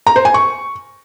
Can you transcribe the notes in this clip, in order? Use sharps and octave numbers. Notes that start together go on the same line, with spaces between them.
A#5
C5
G#5
C#6